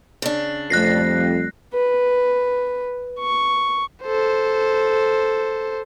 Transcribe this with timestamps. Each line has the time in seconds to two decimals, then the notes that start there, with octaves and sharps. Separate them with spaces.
0.22 C#3 D4
0.70 F2 G3 A3 F#6 A#6 C7
1.74 B4
3.19 C#6
4.03 A4 C5